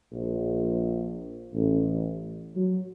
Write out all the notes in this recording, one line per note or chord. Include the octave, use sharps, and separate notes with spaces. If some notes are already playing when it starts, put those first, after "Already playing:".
A#1
A1
F#3